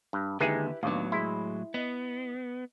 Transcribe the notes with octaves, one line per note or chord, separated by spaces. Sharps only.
G2
D#2 D3 G#3 D#4 E4 G4 G#4 B4
D#2 A2 F#3 B3 D4 F5
G#3 E4 C6
B3 D#5